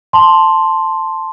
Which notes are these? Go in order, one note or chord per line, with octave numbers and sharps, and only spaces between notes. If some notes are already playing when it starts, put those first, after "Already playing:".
A5 C6